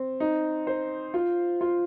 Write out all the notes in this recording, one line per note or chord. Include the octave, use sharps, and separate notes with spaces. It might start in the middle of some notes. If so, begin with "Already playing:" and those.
Already playing: C4
D#4
C5
F4
F4